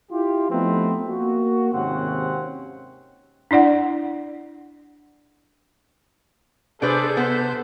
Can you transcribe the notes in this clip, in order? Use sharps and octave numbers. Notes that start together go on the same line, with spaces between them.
E4 F4 G4
F3 A3 B3 C4 D#4 B4
A#3 F#4
G#1 D#2 C3 C4 C#4 F#5
D4 E4 D5 F#5
C3 D4 G#4 A4 B4 C5 D5 G6
B3 C5